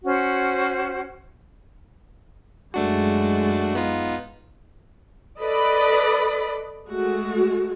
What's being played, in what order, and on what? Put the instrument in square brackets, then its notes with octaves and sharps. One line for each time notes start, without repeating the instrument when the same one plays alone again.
[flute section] C#4 F#4 C5
[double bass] F#2 G#3 [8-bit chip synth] A3 D4 F#4
[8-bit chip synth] B3 D#4 F4
[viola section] A4 B4 D5 D#5 B5
G#3 A3 F#4